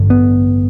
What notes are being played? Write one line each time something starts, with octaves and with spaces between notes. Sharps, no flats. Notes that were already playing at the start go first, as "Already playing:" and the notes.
Already playing: A1 G2 D3
B3